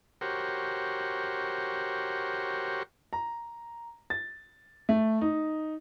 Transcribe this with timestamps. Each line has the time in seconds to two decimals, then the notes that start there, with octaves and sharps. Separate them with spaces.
0.21 F#4 G4 A#4 C5 C#5
3.13 A#5
4.10 A6
4.89 A3
5.21 D#4